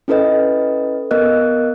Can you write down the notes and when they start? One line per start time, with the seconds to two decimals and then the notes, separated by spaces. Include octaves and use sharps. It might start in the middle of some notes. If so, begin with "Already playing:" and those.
0.08 C#4 E4 A4 B4 D#5
1.11 B3 A#4 D#5 F#6